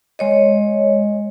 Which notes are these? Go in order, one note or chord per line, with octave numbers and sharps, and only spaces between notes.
G#3 C#5 D#5